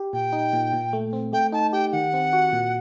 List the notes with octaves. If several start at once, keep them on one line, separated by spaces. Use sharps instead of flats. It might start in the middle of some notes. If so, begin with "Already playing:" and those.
Already playing: G4
A#2 G5
D#4
A#2
A#2
A3
C4
A3 G5
D#4 A5
G4 G5
D#3 F#5
C4
F#4
A#2